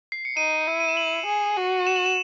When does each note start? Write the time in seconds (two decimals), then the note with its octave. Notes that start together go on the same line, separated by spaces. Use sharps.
0.12 C7
0.25 C#7
0.37 D#4 D#7
0.67 E4
0.80 D#7
0.89 E7
0.97 F#7
1.27 G#4
1.57 F#4
1.87 E7
1.96 F#7
2.06 E7